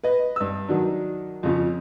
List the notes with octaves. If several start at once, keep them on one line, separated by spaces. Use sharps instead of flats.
B4 D#5
G2 E6
D#3 F#3 D4
F2 C#3 F3